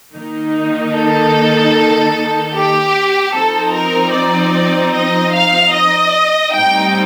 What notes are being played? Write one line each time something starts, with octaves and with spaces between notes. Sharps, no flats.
D#3 A#3 D#4
A4
G4
F3 C4 D#4 A4
A#4
D5
D#5
F5
D#5
A2 G3 C4 D#4 G5